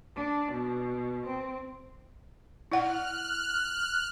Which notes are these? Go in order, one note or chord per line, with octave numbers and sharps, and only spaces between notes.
D4
B2
C4
E4 D5 F#5 F6 F#6